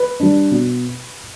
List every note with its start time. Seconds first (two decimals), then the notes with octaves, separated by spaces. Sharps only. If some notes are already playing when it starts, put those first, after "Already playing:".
Already playing: B4
0.20 G3 D4
0.51 B2